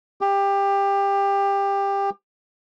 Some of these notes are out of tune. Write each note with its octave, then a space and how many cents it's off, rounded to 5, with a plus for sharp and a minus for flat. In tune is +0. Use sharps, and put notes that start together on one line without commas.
G4 +20